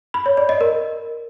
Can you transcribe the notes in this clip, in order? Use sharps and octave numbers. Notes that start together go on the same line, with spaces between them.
B5
C#5
D5
D#5
A#4